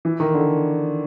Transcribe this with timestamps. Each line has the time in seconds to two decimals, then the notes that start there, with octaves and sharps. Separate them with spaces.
0.05 E3
0.20 D#3
0.34 D3